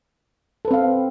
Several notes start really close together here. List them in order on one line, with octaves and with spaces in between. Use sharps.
A4 B4 C4 F5